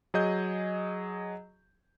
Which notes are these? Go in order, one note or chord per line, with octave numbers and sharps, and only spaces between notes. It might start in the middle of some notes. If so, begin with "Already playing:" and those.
F#3 G#4 D#5 G6